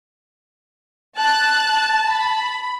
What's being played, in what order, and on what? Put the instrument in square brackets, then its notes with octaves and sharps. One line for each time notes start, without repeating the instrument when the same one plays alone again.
[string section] A5 [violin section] F#6
[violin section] B5